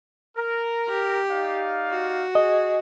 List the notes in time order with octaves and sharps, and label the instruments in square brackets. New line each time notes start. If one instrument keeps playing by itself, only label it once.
[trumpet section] A#4
[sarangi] G4
[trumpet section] D#4 D5 F5
[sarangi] F#4
[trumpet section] G#4 [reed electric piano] D#5